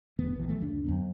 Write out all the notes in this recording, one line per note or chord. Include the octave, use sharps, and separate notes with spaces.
E1 D#3 A3 B3
A#1 E3
F3 A3
F#1 D2 C4 D4
F2 F#3 B3